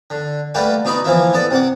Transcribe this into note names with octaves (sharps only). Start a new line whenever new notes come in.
D3
G3 A3 A#3 G4 B4 F#5
B2 D#4 D5 D#5 B5
E3 F3 A#3 E4
B3 A4 D5
C3 F#5 D6